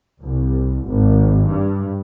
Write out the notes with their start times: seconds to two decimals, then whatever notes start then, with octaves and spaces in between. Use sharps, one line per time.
0.20 C2
0.85 G#1
1.45 G2